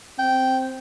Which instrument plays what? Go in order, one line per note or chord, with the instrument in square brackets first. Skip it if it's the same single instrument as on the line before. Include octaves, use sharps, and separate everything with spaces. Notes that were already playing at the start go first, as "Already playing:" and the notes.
[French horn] C4 [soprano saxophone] G5